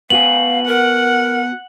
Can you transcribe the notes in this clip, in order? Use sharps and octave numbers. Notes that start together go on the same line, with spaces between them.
B3 F#4 F5 G#5 F#7
A#4 F#5